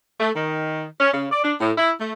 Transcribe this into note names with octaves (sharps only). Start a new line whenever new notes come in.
A3
D#3
C#4
C#3
D5
D4
A2
E4
A3